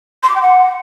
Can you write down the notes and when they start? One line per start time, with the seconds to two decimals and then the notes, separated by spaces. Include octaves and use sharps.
0.23 C6
0.29 D6
0.35 G5
0.41 F#5